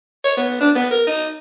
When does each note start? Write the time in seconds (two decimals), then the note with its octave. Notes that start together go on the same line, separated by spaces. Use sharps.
0.24 C#5
0.37 B3
0.61 D4
0.76 B3
0.91 A#4
1.07 D#4